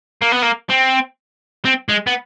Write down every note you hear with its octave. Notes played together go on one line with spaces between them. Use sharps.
A#3
B3
A#3
C4
C4
G#3
B3